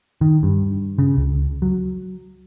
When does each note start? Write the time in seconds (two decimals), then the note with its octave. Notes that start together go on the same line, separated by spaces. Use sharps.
0.21 D#3
0.43 G2
0.99 C#3
1.17 C#2
1.62 F#3